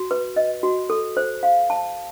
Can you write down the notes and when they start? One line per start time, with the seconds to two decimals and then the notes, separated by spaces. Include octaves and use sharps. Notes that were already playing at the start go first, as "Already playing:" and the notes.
Already playing: F#4
0.11 B4
0.36 D#5
0.63 F#4
0.90 A4
1.17 C5
1.43 F5
1.70 A5